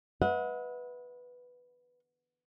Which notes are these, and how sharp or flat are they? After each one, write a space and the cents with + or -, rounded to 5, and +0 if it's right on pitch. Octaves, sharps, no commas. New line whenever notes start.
B4 +0 D#5 +45 F#5 -30